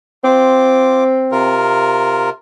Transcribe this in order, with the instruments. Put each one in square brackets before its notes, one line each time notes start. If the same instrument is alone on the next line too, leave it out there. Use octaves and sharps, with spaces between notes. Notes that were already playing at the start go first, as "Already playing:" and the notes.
[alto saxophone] C4 [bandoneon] F4 D6
[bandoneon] C3 F4 A#4